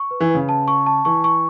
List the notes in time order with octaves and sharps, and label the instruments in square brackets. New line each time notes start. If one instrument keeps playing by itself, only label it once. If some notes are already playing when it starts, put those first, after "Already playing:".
Already playing: [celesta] C#6
B4
[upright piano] E3
[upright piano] C#3 [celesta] B4
[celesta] A5
C#6
A5
[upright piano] E3 [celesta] C#6
[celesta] C#6